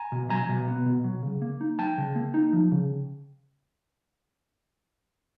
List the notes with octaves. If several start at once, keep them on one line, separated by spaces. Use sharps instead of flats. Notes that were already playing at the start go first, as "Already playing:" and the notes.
Already playing: G#5 A#5
B2
F#3 G#5 A#5
B2
B3
B2
F#3
C#3
A#3
D#4
F#3 G5 A5
C#3
A#3
D#4
F3
C#3